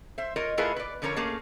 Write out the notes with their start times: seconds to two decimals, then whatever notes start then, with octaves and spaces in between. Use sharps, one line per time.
0.18 C5 E5
0.36 F4 A#4 C#5 D#5
0.58 A3 E4 F4 G#4 A#4 B4
0.76 B4 D5
1.02 D3 F3 C#4 A#4 C#5
1.16 A3 A#3 C#4 G#4